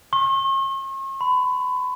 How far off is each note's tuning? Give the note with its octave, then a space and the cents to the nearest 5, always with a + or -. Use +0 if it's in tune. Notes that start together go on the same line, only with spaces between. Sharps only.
C#6 -45
B5 +30